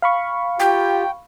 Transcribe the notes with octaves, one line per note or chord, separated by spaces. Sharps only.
F5 B5 C#6
F4 G4 G5